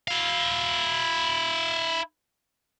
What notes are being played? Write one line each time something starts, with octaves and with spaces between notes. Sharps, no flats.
E4 F5